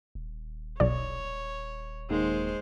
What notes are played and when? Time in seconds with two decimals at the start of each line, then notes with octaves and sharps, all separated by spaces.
0.15 D#1
0.80 B1 C#5 D5
2.10 D#2 G#3 C5